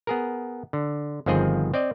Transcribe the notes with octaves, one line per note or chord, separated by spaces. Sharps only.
B3 G#4 A#4
D3
G1 D#3 F3 C4 G#4 D#5
C4 D5 D#5